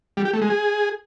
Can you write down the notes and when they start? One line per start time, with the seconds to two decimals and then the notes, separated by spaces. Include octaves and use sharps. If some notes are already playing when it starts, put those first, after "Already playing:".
0.17 G3
0.25 G4
0.33 A3
0.42 G#3
0.50 G#4